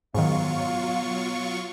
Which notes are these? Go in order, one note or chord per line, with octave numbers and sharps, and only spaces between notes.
G#2 B2 D#3 F#3 F4 F5 C#6